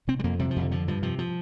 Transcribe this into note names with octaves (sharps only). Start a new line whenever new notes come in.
C3 C4
G3
F2 A#3
C3 G3
F3
F2 D3
D3 F3
G2 F3
C3 F3
F3